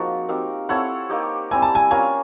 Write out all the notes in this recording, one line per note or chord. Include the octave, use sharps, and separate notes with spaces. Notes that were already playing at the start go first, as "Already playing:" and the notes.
Already playing: F3 A#3 C4 D#4 F#4 G#4
C4 D#4 G4 A#4
C4 E4 A4 C#5 F#5
A#3 D#4 G4
G3 C4 E4 G#5
A5
G#5
A#3 C#4 F4 A#4 G#5